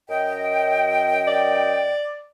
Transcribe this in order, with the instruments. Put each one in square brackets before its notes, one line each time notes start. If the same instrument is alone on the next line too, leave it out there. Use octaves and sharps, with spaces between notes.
[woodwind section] F#2 D#5 G5
[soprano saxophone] D5